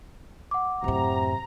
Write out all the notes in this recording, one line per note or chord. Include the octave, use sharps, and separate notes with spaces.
F#5 D6
F#2 A2 C3 A#5